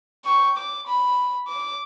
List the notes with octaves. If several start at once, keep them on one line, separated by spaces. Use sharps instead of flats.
G5 C#6
D6
B5
D6